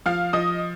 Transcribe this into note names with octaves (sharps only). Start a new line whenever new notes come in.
F3 F5 F6
F3 D#5 D#6